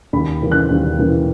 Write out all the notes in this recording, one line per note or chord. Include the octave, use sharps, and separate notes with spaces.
D#2 B5
C#3 E3 A#3
F#6
D#2
C#3 E3 A#3